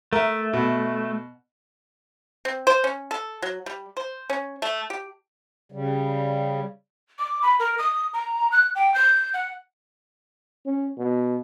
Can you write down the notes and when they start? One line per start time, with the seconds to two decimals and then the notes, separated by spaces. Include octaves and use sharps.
0.13 A3 A#4 E5
0.53 B2
2.45 C4
2.67 C5
2.84 C#4
3.11 A4
3.42 F#3
3.66 G3
3.97 C5
4.30 C#4
4.62 A3
4.90 G4
5.72 C#3 G3
7.19 D6
7.42 B5
7.59 A#4
7.78 D#6
8.13 A#5
8.52 F#6
8.75 G5
8.94 G6
9.34 F#5
10.66 C#4
10.98 B2